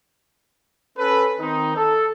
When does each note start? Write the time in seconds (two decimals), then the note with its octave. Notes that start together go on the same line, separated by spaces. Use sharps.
0.98 C#4 A4 B4
1.40 D#3 C4 D#4
1.76 A4